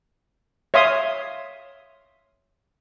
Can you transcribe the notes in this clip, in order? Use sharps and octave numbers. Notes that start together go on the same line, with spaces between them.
C#5 E5 F5 C6 D#6